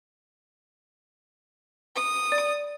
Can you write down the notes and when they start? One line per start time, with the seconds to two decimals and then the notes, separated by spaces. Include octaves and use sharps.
1.96 D#6
2.32 D5